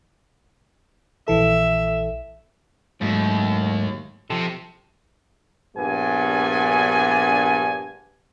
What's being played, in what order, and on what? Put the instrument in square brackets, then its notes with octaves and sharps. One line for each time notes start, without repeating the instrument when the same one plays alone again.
[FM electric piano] A#1 E3 A4 [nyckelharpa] E5
[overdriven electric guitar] D#2 [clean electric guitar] G#2 F#3 A3
[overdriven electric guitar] C3 [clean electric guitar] F3 A4
[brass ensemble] A#1 G2 B3 G#5